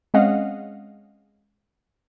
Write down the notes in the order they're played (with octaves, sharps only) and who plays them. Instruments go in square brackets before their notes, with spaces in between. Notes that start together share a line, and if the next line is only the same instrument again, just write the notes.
[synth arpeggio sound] G#3 C4 C#4 D#5 F5 F#5